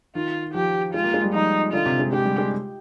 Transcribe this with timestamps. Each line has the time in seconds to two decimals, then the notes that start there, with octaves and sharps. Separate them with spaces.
0.15 D#3 F4
0.54 F3 G4
0.94 G#3 F4
1.04 A#3
1.14 G#3
1.24 G3
1.33 F3 D#4
1.73 D3 F4
1.86 C3
1.99 G#3
2.12 G#3 G4
2.25 G3
2.38 G#3